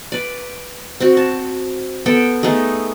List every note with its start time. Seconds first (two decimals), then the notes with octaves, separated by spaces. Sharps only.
0.12 B4 D5
1.00 C4 F#4
1.17 A5
2.06 B3 A4 G5
2.43 A3 B3 D#4 G#4